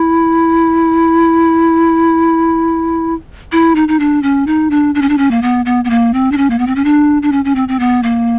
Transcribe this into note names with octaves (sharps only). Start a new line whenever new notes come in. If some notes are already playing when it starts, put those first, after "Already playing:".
Already playing: E4
E4
D#4
D#4
D4
C#4
D#4
D4
D4
C#4
D4
C#4
A#3
B3
B3
B3
A#3
C4
D4
C#4
A#3
B3
C4
C#4
D4
D4
C#4
C#4
C4
C4
B3
A#3